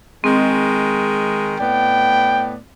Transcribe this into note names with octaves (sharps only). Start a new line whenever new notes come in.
D#3 G#3 C4
A2 B3 D5 G5